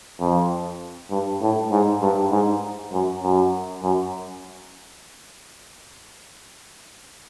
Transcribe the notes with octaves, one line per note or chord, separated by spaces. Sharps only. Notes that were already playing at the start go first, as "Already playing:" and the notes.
F2
G2
A2
G#2
G2
G#2
F#2
F#2
F#2